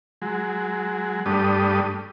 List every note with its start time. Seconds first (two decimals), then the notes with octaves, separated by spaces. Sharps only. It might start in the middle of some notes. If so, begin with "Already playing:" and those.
0.22 F#3 G#3
1.26 G2 G3 A3 D4 D#6